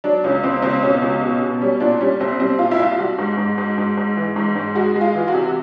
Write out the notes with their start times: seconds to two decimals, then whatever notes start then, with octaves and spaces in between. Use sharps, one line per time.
0.04 F#3 D4
0.24 C#2 C#4
0.43 C#2 C4
0.62 C#2 C4
0.83 B2 C#4
1.02 C#2
1.22 B2
1.42 B2
1.61 G3 C#4
1.80 A#2 D4
2.01 G3 C#4
2.20 C2 C4
2.40 G3 C4
2.59 A#2 F4
2.71 E4
2.79 C2 F4
2.98 G3 F#4
3.18 G#2
3.37 G#2
3.58 G#2
3.78 G#2
3.97 G#2
4.17 E3
4.36 G#2
4.56 G#2
4.75 G#3 F#4
4.95 G#3
5.01 F4
5.15 E3
5.28 F#4
5.34 C3